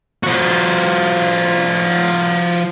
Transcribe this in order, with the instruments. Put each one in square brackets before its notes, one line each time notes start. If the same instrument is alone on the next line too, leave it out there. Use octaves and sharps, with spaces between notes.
[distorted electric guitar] F3 F#4